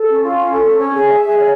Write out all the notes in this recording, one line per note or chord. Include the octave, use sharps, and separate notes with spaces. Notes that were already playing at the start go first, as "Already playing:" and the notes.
Already playing: A4
C#4
F4
C#4
A4
C#4
C#5
G#4
E5
G#4
C#5